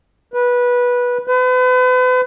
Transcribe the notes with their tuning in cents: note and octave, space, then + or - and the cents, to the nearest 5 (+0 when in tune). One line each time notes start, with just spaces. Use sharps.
B4 -15
B4 +40